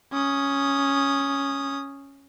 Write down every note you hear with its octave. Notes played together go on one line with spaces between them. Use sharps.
C#4 D#6